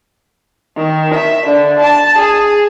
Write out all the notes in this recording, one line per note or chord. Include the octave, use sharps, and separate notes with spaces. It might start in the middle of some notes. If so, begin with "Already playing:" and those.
D#3
E5
D3
A5
G#4